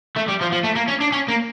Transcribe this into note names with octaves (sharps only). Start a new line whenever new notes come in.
A3
G3
F3
F3
A3
A#3
C#4
D4
C#4
A#3